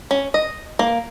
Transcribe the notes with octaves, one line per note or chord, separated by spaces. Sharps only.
C#4
D#5
A#3